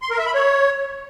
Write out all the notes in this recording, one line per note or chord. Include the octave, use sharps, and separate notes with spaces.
C6
A#4
E5
B5
C#5